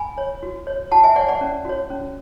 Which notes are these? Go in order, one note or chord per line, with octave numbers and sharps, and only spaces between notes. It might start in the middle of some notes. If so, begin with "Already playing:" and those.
Already playing: G#5 B5
C#5
F#4
C#5
F#4 F#5 A5
E5 G#5
C#5 D5 F#5
D5 F#5
C#4
F#4 C#5
C#4